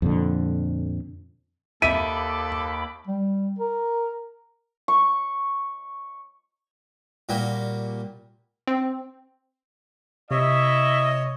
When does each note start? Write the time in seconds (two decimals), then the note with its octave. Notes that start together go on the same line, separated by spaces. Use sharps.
0.02 F2 A#2 D3
1.82 D#2 A4 E5 B5 D6 D#7
3.07 G3
3.59 A#4
4.88 C#6
7.29 A#2 G3 A#3 F#4
8.68 C4
10.31 C3 E4 C#5 D#5 E5